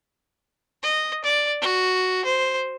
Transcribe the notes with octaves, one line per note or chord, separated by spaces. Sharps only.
D#5
D5
F#4
C5